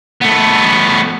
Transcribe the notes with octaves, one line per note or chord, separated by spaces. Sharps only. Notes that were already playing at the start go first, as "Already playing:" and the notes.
A3 B3